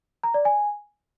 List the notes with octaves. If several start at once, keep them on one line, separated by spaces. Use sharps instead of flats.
A#5
D5
G#5